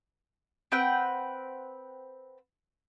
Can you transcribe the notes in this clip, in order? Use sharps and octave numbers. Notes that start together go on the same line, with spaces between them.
C4 B4 F#5 G5